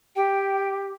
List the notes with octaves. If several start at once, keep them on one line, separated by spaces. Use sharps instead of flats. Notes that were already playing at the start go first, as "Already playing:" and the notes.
G4 G5